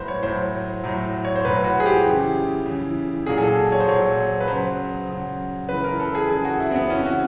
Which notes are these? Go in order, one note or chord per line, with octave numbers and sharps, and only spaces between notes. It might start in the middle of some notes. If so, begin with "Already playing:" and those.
Already playing: A2 F#3 B4 C5
C#5
A2 F#3 C5
A2 F#3
C#5
C5
A2 F#3 B4
F#4
G#4
G4
C#3 E3
C#3 E3
A#2 F#3 G#4
G#4
A4
C#5
C5
A#2 F#3 C#5
B4
C#3 F#3 C5
C#3 F#3
C#3 E3 B4
A#4
A4
G#4
C#3 E3 G#4
F#4
E4
C4
B3
C#3 E3 C#4
F#4